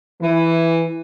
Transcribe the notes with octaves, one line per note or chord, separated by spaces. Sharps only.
E3